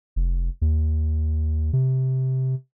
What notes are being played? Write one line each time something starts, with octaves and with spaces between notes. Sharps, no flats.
F1
D#2
C3